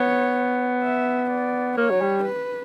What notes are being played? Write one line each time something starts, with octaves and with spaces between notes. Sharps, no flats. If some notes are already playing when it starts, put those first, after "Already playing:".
Already playing: B3 C#5
E5
D5
A#3 C#5
F#3
G3
B4